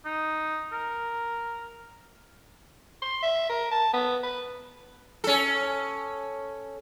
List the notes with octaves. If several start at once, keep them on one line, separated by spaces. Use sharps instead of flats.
D#4
A#4
C6
E5
A#4
A5
B3
B4
C#4 A4